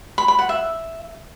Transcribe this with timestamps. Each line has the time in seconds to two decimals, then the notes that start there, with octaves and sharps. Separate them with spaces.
0.18 B5
0.28 B5
0.39 F#5
0.49 E5